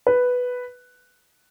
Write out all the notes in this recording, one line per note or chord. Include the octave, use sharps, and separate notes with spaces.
B4